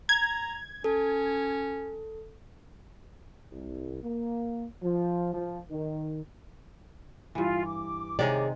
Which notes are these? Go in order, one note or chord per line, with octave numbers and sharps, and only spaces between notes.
A#5 G#6
C#4 A4
C2
A#3
F3
F3
D#3
G2 E3 F4
D6
C3 D#3 G#3 G#4 C#5 D5